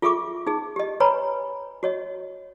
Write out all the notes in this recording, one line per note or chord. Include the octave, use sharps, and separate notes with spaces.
F4 G#4 A4 E5 C#6 D6
D#4 G#4
G4 D#5
B4 C#5 G#5 A#5 B5
F#4 C#5 D#5